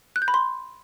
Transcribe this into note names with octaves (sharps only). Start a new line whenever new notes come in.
F#6
G6
B5
C6